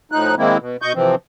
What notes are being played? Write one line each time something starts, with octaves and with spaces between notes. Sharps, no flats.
A2 F3 D#4 F#6
D#3 G#3 A#3 C4 E4
B2
B2 D#5 C#6 G6
C3 E3 F3 C4